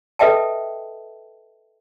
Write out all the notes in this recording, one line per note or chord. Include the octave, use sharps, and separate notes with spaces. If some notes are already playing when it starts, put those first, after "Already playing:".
A4 B4 D#5 E5 G5 A5